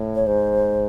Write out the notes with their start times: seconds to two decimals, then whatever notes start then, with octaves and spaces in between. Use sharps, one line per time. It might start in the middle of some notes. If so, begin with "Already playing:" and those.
Already playing: A2
0.15 C#5
0.26 G#2 C5